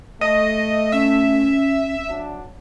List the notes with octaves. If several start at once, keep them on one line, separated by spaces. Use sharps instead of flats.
A3 D#5
C#4 E5
F#3 D4